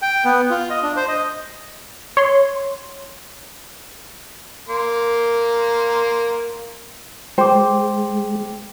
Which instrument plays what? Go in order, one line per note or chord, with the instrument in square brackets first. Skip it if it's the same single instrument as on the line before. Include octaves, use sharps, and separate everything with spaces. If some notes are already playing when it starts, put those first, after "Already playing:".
[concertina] G5
B3
F4
D#5
D4
C5
D#5
[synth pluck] C#5 C6
[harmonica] A#3 C6
[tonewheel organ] G#3 [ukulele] C5 [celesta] G5 D6